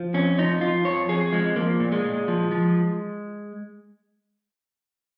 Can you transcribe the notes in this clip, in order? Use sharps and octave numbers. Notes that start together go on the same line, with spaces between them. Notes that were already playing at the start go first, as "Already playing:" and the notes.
Already playing: F3
F2 C#4
F3 D#4
F3 F4
F2 C#5
F2 G#4
F3 G#3
F3 A#3
A#2
G#3
A#2
F3
F3